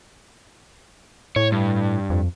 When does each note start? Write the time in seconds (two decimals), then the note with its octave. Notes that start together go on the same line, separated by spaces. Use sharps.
1.36 A2 C#5
1.52 G2
2.10 F2